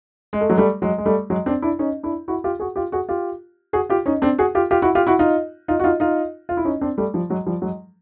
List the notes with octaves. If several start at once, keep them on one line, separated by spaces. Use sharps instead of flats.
G#3
A3
F#3 G#3
G3 A3
F#3 G#3
G#3
G3 A3
F#3 G#3
C4 D4
D4 E4
C#4 D#4
D4 E4
E4 F#4
F4 G4
F#4 G#4
F4 G4
F#4 G#4
F4 G4
F#4 G#4
F4 G4
C#4 D#4
C4 D4
F#4 G#4
F4 G4
F4 G4
E4 F#4
F4 G4
E4 F#4
D#4 F4
D#4 F4
F#4
D#4 F4
D#4 F4
F4
E4
C#4 D#4
C4 D4
G3 A3
F3 G3
F#3 G#3
F3 G3
F#3 G#3